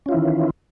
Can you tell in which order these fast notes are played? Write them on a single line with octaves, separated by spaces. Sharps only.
C#4 F4 E4 E3 D#3